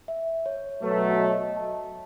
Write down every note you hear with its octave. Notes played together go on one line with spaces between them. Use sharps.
E5
C#5
B2 F#3 A3 B4
C#5
D#5
D#5
A5